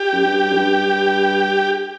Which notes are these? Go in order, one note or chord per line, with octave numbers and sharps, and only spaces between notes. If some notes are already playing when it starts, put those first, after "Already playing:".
Already playing: G4
F#2
G2
F#2
G2